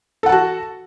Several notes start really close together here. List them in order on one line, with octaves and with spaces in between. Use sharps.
A4 F#5 A5 F#4